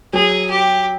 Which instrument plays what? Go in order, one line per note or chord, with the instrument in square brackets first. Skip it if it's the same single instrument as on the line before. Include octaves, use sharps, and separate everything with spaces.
[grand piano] F#3 [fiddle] G#4
[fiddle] G4